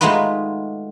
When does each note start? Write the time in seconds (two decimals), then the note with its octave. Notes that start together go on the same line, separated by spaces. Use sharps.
0.01 G#3 A3 D#4 F4 F#4 B4